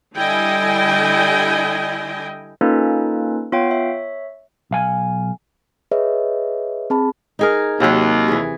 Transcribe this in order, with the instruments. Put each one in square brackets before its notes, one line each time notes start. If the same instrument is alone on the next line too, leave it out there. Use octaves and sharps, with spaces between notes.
[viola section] D3 G3 E4 D#5 G5 G#5
[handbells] A#3 C#4 D#4 F4 A4 B4
B3 F4 C#5 F5 G5
C#5 E5
[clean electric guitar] B1 F5 G#5
[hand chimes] G#4 B4 C#5 D#5 E5
C4 G#4 A5 B5
[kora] D#4 G#4 A#4
[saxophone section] D#2 [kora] C3 F#3
[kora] E3 G#4